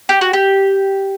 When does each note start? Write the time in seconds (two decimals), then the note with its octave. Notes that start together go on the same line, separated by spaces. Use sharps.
0.09 G4
0.21 F#4
0.33 G4